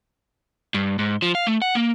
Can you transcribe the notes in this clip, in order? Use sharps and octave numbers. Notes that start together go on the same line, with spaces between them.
G2
G#2
F3
F5
A3
F#5
A#3